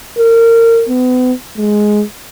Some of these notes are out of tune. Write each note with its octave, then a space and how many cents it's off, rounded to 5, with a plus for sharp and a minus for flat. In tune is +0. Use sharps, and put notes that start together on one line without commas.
A#4 -25
B3 +40
G#3 +5